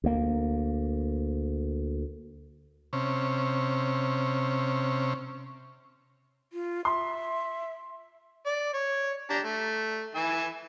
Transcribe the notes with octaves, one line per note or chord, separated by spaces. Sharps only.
D2 A#3
C3 C#4
F4
E5 C6
D5
C#5
D4 G4 A#5
A3
E3 G#5 E6